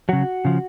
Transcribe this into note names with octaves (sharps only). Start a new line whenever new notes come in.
C#3 F#3 F#4
C#3 F3